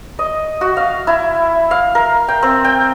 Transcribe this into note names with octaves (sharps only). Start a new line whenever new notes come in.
D#5
F#4
F5
E4
F5
A#4
G5
C4
G5